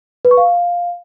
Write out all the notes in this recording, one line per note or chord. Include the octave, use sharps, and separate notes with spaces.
B4
C#6
F5